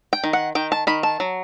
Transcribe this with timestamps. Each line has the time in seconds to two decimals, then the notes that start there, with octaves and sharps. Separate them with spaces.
0.13 G5
0.24 D#3
0.33 F#5
0.55 D#3 G5
0.72 A5
0.87 D#3 B5
1.03 A5
1.20 F#3